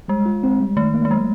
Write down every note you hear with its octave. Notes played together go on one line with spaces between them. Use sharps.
G3 G#3
F4
C4
G3
D#3 A3
A#3
A3
F#3 G#3